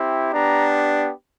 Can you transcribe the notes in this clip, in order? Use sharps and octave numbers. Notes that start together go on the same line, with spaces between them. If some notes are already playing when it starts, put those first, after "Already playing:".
Already playing: C4 E4 G4
B3 D4 G4 A#5